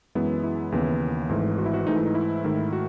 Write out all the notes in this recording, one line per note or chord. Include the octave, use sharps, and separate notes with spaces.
F#2 E3 G#3 B3 E4
E4
D#2 C#3 E3 B3
G#1 G#2 E3 A3
F#4
E4
F#4
G#2 E3 A3 D#4
E4
D#4
E4
G#2 D#3 A3
F#4